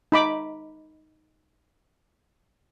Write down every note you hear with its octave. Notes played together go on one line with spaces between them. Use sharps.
D#4 B5 D6